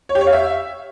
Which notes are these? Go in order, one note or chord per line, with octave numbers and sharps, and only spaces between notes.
C#5
G4
C#5
F5
E5